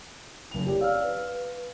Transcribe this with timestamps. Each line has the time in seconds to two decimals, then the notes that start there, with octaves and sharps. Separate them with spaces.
0.51 F#1 F7
0.67 G4 C#5 D5
0.81 D5 F5 E6 F6
1.03 B4